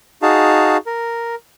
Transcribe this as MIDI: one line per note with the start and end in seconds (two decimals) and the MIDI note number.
0.22 0.77 63
0.22 0.77 66
0.22 0.77 68
0.22 0.77 77
0.22 0.77 81
0.86 1.35 70